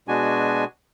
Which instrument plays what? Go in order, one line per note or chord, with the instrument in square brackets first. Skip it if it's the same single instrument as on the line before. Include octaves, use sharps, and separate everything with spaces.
[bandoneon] B2 G#3 D4 F#4 G#5